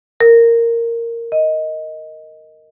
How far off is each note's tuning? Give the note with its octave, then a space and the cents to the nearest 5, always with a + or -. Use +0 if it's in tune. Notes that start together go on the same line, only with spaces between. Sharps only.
A#4 -10
D#5 +10